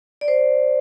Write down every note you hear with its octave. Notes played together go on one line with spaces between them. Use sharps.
D5
C5